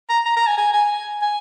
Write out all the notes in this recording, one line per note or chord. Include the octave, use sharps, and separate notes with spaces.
A#5
A#5
A#5
G#5
G#5
G#5
G#5